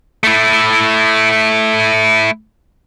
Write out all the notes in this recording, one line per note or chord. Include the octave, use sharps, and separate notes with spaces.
A3 E4